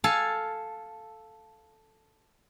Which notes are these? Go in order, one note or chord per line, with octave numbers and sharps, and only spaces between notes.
A4 F5 G#5 A5